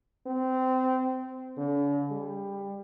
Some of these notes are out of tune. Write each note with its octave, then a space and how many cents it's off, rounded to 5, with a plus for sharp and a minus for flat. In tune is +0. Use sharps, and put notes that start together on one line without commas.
C4 -20
D3 -45
G3 +20